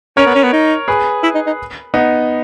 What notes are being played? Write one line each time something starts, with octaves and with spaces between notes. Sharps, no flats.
C#4 A#4 C#5
B3
C#4
B3
D#4
G#4 B4
E4
D#4
D#4
B3 D#4